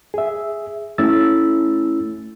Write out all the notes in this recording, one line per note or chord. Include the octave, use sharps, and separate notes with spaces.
G#4 E5
A3 C#4 E4 E6 A6